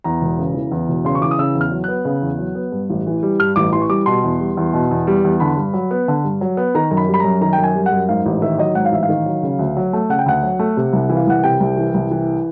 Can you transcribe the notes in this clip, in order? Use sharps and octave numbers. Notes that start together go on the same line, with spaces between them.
E2 A#5
E1
C#3
E3
E2
E1
C#3 C6
C#6
E3 D6
D#6
C#3 E6
E2
F6
F#3
B3 F#6
C#3
E2
F#3
B3
G2
A1
E3
G3
G2 F6
A1 D6
E3 C6
C#6
G3 D6
B2 C6
E2
G3
E2
B2
E2
G3
E2
D3 B5
G2
F#3
B3
D3
G2
F#3
B3
D#3 A#5
F#2 A#5
B5
G3
B5
F#2 A#5
D#3 A#5
G5
F#2 G#5
G3
F#5
F#2
G#2 F5
A1
D#3 E5
F#3 D#5
G#2 F#5
F5
A1 E5
F5
D#3
F#3
C#3
D2
F#3
A3
C#3 F#5
G5
D2 F#5
F#3
A3
C3
C2
E3
F5
C2 F#5
C3 G5
C2
E3
C2
E3